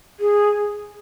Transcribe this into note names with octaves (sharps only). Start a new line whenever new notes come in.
G#4